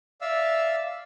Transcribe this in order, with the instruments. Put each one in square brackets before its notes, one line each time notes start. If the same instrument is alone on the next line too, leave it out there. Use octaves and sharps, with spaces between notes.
[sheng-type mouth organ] D5 E5 F5 E6